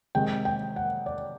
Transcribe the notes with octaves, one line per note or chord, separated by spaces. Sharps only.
C3 D#3 G#3 G5
G5
F#5
D5